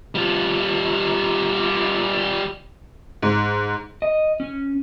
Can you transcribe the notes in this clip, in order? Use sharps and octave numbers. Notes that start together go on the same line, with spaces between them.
G3 F4
G#2
D#5
C#4